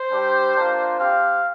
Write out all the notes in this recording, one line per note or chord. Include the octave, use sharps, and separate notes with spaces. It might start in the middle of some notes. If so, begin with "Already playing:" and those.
Already playing: C5
G3 D4 G4
A#3 D4 F4
C4 G4 F5